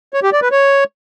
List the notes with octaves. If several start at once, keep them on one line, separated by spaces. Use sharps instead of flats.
C#5
G4
D5
B4
C#5